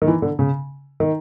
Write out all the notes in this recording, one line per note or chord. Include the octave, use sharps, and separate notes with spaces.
D#3
E3
D3
C#3
D#3